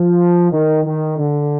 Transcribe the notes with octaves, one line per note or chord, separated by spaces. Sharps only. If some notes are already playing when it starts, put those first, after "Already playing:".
Already playing: F3
D#3
D#3
D3